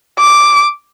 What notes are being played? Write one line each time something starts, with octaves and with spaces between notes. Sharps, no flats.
D6